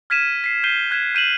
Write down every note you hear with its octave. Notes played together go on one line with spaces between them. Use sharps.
F6 G#6 B6 D#7 E7
B6 C7
G6 C7 D#7 G7
F#6 G#6 B6 E7
G6 D#7 E7 F#7